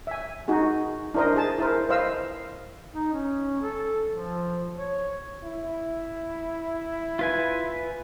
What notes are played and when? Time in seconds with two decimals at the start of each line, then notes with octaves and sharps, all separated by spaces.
0.07 E5 G#5
0.48 D#4 F#4 G#4
1.14 D4 E4 A#4 C5 D#5
1.36 G#4 A5
1.58 E4 A#4 C5
1.89 B4 C5 D#5 F5 E6
2.94 D#4
3.12 C#4
3.61 A4
4.10 F3
4.76 C#5
5.44 E4
7.19 F4 B4 G#5